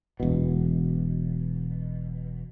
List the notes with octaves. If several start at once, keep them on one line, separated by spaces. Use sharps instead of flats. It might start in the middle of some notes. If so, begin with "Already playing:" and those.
E1 B2